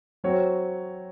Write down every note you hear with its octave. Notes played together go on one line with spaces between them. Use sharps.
F#3 C4 F#4 C#5